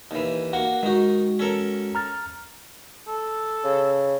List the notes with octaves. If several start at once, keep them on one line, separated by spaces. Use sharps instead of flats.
D#2 E3
A#3 F#4 F#5
D#3 G#3 D#4 F#4
C#4 A4 A#4
A#5 F6 A6
A4
C#3